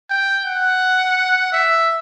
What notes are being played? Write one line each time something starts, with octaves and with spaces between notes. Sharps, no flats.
G5
F#5
E5